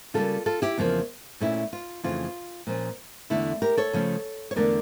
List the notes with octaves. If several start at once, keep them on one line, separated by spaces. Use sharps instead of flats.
C#3 G3 A#3 F4 A4
F4 A4
E4 G4
E2 C#3 F3 A#3
A#2 A3 C#4 E4
F4
F2 C#3 E3 A3 F4
A#2 F3 C#4
E2 D3 A3 E4
G4 A#4
A4 C#5
C#3 F3 A3 C#4
C#5
E2 D3 A3 D4 A#4 D5